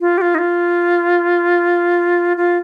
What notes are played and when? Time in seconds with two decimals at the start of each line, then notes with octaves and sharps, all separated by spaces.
0.01 F4
0.18 G4
0.21 F4
0.35 D#4
0.38 F4
2.37 F4